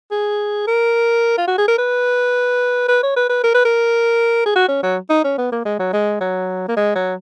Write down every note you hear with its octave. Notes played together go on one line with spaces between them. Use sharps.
G#4
A#4
F4
F#4
G#4
A#4
B4
B4
C#5
B4
B4
A#4
B4
A#4
G#4
F#4
C#4
F#3
D#4
C#4
B3
A#3
G#3
F#3
G#3
F#3
A#3
G#3
F#3